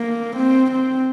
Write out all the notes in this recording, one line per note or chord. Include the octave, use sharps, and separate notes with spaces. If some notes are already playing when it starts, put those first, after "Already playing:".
Already playing: A#3
C4
C4